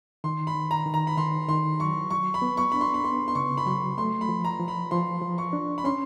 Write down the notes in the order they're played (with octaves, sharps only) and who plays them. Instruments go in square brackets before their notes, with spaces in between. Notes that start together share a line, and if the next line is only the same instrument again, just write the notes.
[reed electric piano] D#3 [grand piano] C6
[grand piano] B5
[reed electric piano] D#3
[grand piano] A#5
[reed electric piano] D#3
[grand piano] A#5
B5
[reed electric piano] D#3 [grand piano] C6
[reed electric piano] D#3 [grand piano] C6
[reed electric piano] F#3 [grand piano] C#6
[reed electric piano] F#3 [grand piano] C#6
[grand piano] B5
[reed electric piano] B3
[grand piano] C#6
[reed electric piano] D4 [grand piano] B5
[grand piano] C6
B5
[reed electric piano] B3 [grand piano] C6
[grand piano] C6
[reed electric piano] C#3 [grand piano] C#6
[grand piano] B5
[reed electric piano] F#3 [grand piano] C6
[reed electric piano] A3 [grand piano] C6
[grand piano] B5
[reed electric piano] F3
[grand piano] A#5
[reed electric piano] F3
[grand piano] B5
[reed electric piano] F3 [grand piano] C6
[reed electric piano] F3
[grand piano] C#6
[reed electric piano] D4
[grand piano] B5
[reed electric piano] C#4 [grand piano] C6